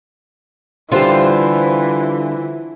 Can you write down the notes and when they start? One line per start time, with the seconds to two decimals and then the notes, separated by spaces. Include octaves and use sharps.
0.92 D3 E3 G3 F4 G4 C5